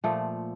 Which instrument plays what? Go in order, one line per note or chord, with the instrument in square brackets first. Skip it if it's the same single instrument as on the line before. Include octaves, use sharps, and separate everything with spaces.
[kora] A#2 F3 A3